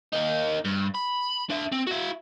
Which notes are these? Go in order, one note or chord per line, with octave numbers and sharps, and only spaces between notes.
A#3 D#4
G2
B5
D4 E5
C4
E4 F#4